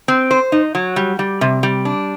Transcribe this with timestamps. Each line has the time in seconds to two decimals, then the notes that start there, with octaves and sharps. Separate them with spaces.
0.08 C4
0.31 C5
0.52 D#4
0.75 F#3
0.96 G3
1.19 G3
1.41 C3
1.63 G3
1.85 D4